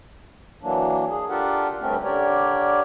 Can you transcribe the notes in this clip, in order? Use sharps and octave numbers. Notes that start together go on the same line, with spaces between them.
E3 F#3 A#3 D4
G#4
D4 F4 G4 A4 A#4 F#5
D2 G2 A3 C4 C#4 A#4
D3 G4 A#4 C#5 D5